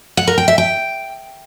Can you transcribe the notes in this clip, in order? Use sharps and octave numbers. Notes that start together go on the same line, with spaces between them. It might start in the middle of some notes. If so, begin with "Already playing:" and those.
F#5
A#4
G5
E5
G5